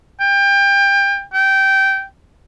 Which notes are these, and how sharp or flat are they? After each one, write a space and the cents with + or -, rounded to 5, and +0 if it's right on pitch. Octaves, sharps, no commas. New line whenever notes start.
G5 +25
G5 -15